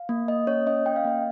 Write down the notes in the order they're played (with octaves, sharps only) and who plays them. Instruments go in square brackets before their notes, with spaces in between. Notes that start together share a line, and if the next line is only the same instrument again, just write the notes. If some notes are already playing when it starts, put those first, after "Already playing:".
Already playing: [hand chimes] F5
A#3
A#3 D#5
C#4 C#5
C#4 D#5
C#4 G5
F5
A#3 D#5